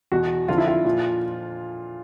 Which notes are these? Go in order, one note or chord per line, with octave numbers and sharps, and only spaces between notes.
E2 B2 F#4
F2 D3 F3 F4
E4
F4
A#2 F3